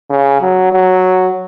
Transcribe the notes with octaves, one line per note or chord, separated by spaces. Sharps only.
C#3
F#3
F#3